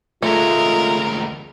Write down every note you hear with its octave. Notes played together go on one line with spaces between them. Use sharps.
D2 G#3 A3 F4 A#4